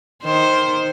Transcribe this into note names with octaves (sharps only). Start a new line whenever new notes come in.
D#3 C5